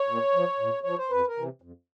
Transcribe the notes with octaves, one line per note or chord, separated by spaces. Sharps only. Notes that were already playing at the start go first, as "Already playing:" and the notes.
Already playing: C#5
A#2
F3
A#2
F3 C#5
C5
F2 B4
A#4
C3 E3
F2